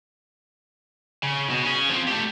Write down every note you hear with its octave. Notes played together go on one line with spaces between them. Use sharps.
C#3
B2
C#4 G#4
F3 C4
A3 G4